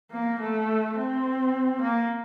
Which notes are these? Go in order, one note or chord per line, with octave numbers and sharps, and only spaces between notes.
A#3
A3
C4
A#3